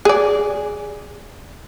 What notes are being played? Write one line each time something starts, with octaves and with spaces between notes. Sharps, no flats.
G#4 D5